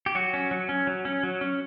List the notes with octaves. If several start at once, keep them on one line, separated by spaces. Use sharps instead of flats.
G4
F#3 F#4
C#4
F#3
C#4
F#3
C#4
F#3
C#4